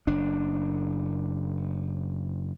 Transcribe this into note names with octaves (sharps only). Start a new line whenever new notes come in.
F#1 D4